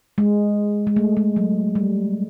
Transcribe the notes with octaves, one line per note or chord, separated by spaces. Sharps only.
G#3
G#3
A3
G#3
F#3
G3